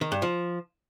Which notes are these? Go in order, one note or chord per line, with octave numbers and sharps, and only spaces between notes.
D#3
G2
F3